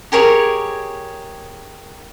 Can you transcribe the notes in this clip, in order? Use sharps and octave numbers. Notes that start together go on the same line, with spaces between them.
G4 G#4 A#4 C#5